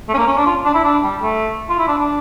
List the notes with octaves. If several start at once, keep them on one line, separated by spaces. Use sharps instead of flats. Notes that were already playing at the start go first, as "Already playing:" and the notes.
A3
C#4
A#3
C#4
D4
F4
D4
E4
D4
G3
A3
F4
E4
D4
D4